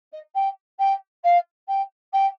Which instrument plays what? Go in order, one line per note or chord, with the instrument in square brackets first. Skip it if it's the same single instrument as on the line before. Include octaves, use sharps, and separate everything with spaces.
[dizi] D#5
G5
G5
F5
G5
G5